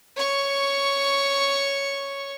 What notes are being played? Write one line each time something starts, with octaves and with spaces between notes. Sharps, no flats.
C#5 C#6